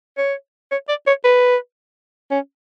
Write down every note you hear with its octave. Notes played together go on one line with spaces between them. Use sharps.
C#5
C#5
D5
C#5
B4
C#4